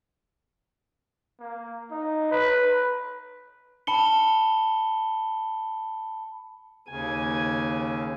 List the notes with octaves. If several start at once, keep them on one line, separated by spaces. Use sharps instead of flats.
A#3
D#4
B4
A5 B5 C#7 G7
D#2 C#3 G#5